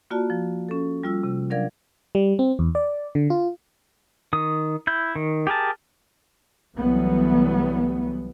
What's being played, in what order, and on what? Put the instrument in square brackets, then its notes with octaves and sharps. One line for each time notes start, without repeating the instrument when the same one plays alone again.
[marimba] A#3 F4 F#4 D5 A5
F3
C#4 A4
G3 F4 E6
C3
F#3 D4 A#4 D5 F5 G#6
[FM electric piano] G3
C4
E2
D5
D3
F4
[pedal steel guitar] D#3 D#6
E4 G6
D#3
G4 G#4 A#4 A5
[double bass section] C2 E3 F#3 G3 A3 B3